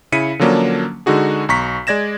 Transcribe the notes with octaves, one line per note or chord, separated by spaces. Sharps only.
C#3 E4 B6 C#7 D#7
D3 F3 F#3 A#3 C#4 D4
D3 G#3 D#4 F#4 G#4
B1 A#5 C#6 B6
G#3 D5 G#6 A#6 E7